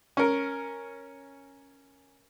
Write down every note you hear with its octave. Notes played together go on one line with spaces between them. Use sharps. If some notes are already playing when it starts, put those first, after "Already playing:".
C#4 A#4